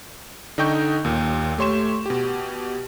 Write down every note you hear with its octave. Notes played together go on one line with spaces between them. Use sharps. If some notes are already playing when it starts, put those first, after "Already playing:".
D3 D#4 D#5 G5 C#6 G6
D#2 A#2
A3 G4 C#5 C6 C#6 E7
B2 G4